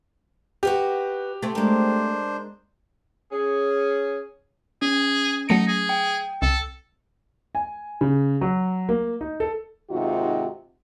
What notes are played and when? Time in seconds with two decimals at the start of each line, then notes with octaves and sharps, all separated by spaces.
0.63 F#4 G4 B4 D#5
1.42 A3 C4
1.55 G#3 A#3 D4 C5
3.32 C#4 G#4
4.82 C#4 G#4
5.49 F#3 A3 D#4 C#7
5.67 G#4
5.89 G5
6.42 C2 A4
7.55 G#5
8.01 C#3
8.41 F#3
8.89 A#3
9.21 D#4
9.40 A4
9.91 D#2 G#2 C3 D#4 F4 F#4